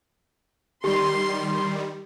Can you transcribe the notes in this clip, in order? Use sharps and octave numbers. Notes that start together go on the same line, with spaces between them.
D#3 G3 G4 C6